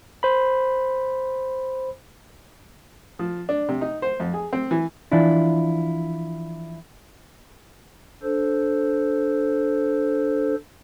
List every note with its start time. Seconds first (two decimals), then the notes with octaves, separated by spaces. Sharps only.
0.23 C5 B5
3.19 F3
3.49 D4
3.69 C3
3.81 D#4
4.02 C5
4.20 F2
4.34 G#4
4.53 C4
4.71 E3
5.11 E3 F3 D4 E4 F4
8.23 D4 A4 C5